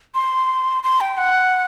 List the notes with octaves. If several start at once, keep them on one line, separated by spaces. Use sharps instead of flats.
C6
C6
G5
F#5